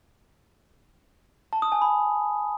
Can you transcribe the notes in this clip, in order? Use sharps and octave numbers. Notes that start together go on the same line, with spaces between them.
A5
D#6
G#5
B5